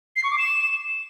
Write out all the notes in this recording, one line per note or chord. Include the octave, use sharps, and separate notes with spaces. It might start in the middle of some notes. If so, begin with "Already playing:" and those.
C7
C#6
D6
E7